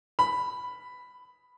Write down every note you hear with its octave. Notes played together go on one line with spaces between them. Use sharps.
B5